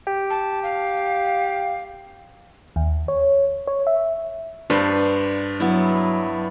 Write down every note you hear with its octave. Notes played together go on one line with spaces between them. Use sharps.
G4
A5
F5
D#2
C#5
C#5
E5
G2 D4 A4 B4 C5
F#3 B3 E4